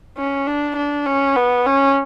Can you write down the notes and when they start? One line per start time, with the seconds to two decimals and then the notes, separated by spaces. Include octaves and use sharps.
0.18 C#4
0.47 D4
0.76 D4
1.06 C#4
1.36 B3
1.66 C#4